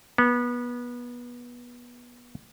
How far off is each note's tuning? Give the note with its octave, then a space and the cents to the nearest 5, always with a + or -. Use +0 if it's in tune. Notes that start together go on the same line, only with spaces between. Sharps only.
B3 -25